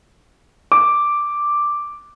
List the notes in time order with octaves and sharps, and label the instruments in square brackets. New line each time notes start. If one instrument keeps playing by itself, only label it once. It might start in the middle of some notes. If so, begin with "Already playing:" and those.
[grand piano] D6